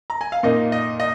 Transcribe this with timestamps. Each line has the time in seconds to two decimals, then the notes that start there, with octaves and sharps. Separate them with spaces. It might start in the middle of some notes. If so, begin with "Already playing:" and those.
0.10 A#5
0.21 G#5
0.32 F5
0.43 A#2 A#3 D#4 D#5
0.72 D#5
1.00 D#5